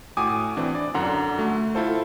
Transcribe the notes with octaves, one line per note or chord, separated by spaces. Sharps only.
A2 F#4 G5 G#5 D6 D#6
E3 C4 D4
D5
F#2 D3 F#5 A#5 C6
A3 F#4
E4 F4 A4 C5